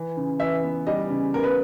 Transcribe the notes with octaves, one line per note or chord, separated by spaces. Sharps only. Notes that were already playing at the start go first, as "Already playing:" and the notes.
Already playing: E3
C#3
E3 E5
B3
G3 D#5
C#3
B3 A#4
B4